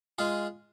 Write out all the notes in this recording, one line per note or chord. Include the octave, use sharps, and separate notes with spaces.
G#3 F4 G#4